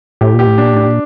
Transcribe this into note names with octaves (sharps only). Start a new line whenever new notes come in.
A2 G4
A#2
G4
A2
A#2 D4
A2 D4
A#2